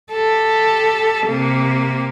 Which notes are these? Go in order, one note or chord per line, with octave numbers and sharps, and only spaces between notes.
G4 A4
C3 A#3